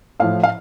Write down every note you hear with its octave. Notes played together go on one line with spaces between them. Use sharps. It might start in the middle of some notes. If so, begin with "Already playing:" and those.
A2 F3 F5
F5